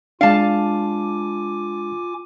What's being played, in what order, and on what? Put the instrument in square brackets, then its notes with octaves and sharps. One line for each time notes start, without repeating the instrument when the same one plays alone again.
[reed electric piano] G#3 D4 [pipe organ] F4 G#5 D6 [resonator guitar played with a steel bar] F5 A5